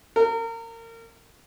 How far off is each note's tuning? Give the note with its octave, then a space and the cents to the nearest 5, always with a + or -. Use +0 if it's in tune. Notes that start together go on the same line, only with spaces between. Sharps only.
A#4 -30